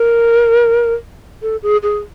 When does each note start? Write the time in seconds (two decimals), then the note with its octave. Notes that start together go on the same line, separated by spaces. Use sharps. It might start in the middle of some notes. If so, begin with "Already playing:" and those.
Already playing: A#4
1.42 A4
1.63 G#4
1.83 G#4